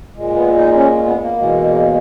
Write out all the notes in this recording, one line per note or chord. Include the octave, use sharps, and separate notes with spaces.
A#2 G#3
B3
D#4
C#4
B3
A#3
E2 B2 G#3